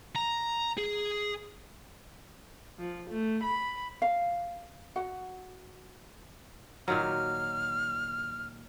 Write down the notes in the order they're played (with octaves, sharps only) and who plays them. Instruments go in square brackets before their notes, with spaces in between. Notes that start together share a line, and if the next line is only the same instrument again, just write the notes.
[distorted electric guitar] A#5
G#4
[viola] F3
A3
B5
[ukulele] F5
F#4 F#5
[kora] A#2 D#3 F#3 [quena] F6